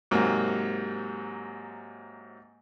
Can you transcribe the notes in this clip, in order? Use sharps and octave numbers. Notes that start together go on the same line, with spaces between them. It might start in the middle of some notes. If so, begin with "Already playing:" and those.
G#2 C3 F#3 A#3